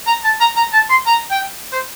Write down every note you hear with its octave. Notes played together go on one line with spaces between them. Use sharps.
A#5
A5
A#5
A#5
A5
C6
A#5
G5
C5